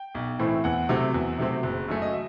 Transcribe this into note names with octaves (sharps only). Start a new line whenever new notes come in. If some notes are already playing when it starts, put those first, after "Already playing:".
Already playing: G5
B1
A2 E3 A3 C4
E2 F#5
C3 F#3 A3 C4
E2
C3 F#3 A3 C4
F#1
F#2 F#3 A3
D#5
E5